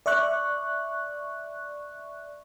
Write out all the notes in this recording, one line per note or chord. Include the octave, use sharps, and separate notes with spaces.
D5 E5 C#6 F#6